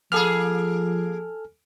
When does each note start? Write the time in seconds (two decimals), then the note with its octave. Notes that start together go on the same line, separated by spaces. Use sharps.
0.12 F3 A#3 G#4 A4 G#5 F6